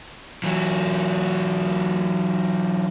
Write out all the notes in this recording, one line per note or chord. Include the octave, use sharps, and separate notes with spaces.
E3 F#3